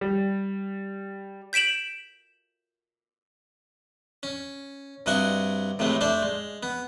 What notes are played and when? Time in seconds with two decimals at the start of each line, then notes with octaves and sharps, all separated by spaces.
0.01 G3
1.53 G6 B6 D7 E7 F#7
4.23 C#4
5.06 G2 C3 F#4 D#5 F#5 G#5
5.79 A2 C3 E3 G#3 A3
6.01 A3 D4 C5 D5
6.22 G#3
6.63 B3